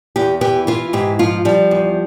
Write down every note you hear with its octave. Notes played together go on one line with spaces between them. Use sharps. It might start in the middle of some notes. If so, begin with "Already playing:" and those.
E2 G4
E3 G4
E3 F4
G#2 G4
F3 F4
F3 G3
E2